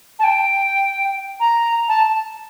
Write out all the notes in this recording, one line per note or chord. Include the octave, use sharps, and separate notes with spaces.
A5
G5
A#5
A5